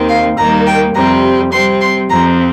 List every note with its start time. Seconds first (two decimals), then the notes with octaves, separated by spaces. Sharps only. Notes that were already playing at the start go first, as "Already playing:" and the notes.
Already playing: D#2 D#3 C4
0.09 F5
0.37 D#2 D#3 G3 A#3 A#5
0.67 G5
0.95 F2 C3 G3 C4 A#5
1.52 C3 G3 C4 C6
1.81 C6
2.09 F2 F3 C4 A#5